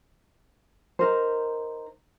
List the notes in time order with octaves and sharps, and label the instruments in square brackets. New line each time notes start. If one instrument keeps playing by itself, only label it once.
[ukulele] D#4 A#4 C5